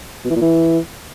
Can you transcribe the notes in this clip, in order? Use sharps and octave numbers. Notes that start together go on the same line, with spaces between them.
B2
E3
A#2
E3